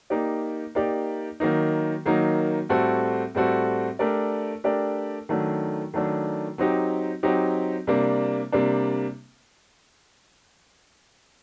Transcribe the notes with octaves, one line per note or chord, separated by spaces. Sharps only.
A#3 D#4 G4 D5
A#3 D#4 G4 D5
D#3 F#3 A#3 D#4
D#3 F#3 A#3 D#4
A2 G3 C4 F#4 A4
A2 G3 C4 F#4 A4
A3 D4 G4 A#4 D5
A3 D4 G4 A#4 D5
D#3 F#3 A3 D4
D#3 F#3 A3 D4
F#3 C4 D#4 G4
F#3 C4 D#4 G4
C3 G3 A#3 D4
C3 G3 A#3 D4